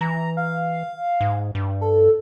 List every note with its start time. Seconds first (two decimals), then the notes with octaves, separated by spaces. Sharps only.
0.01 E3 A#5
0.37 F5
1.21 G#2
1.55 G2
1.81 A4